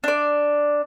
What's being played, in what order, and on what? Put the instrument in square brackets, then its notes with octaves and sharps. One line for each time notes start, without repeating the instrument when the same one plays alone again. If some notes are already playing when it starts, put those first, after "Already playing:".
[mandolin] D4 D5